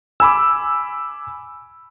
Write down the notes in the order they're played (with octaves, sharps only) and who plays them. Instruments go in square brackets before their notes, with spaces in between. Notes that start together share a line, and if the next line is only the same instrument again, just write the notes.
[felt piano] G#5 B5 D6 [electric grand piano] E6